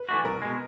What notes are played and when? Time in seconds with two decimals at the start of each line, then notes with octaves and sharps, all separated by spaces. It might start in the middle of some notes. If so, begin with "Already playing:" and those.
Already playing: B4
0.09 E3 A3 D4 F#4
0.24 C2 A#4
0.42 B2 G#3